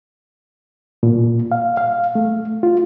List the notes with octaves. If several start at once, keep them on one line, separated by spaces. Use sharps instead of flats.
A#2
F5
F5
A3
F4